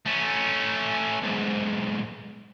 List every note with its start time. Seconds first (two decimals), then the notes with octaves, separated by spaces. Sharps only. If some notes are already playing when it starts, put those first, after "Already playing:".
0.06 A3 C#4
1.22 B1 G#2